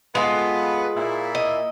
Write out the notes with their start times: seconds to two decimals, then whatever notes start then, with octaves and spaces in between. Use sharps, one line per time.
0.15 G#3 B3 F4 A4 B4
0.97 A#2 E4
1.35 D#5